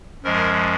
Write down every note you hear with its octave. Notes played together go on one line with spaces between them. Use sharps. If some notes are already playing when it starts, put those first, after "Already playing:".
F#2 F3 G#3 A#4